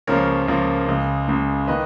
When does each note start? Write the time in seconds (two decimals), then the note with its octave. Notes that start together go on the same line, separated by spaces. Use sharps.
0.07 C#2 C#3 F3 A#3 A#4 C#5
0.48 C#2 C#3 F3 A#3
0.88 C#2 C#3 G#3
1.28 C#2 C#3 G#3
1.67 D#3 A#3 B4 D#5